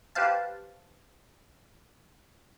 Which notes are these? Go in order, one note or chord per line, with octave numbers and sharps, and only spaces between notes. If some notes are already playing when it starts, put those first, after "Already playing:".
G4 B4 C5 F5 A5